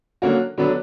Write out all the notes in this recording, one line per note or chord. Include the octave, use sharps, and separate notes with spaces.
D3 F#3 A#3 C#4 F#4
D3 F#3 B3 D4